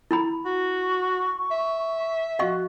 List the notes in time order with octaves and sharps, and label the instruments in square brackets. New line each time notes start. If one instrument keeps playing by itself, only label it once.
[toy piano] E4 A#5 B5
[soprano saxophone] F#4 [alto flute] C#6
[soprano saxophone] E5
[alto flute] F#4 [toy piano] D#5 F5 C#6